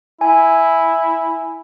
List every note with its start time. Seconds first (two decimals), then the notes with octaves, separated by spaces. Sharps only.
0.21 E4 G#5